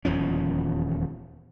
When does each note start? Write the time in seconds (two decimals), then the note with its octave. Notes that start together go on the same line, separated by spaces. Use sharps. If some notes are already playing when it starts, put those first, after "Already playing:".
0.05 D#1 E2 F3 C#4